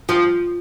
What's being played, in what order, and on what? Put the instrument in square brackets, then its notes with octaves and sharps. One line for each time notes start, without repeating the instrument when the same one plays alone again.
[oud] F3